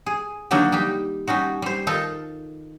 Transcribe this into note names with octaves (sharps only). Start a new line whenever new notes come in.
G#4
D3 D#3 F#3 A#3 D4 D#4
G3 D#4 G4
G3 C#4 D#4 F#4
G3 C5
D#3 D#4 F4 A4